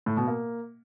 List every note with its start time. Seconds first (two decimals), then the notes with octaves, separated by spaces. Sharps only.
0.06 A2
0.17 B2
0.27 A#3